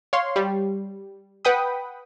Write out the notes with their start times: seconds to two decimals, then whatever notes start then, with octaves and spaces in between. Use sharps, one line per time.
0.13 C#5 F5 C6
0.36 G3
1.45 B4 F#5 G5 B5 D#6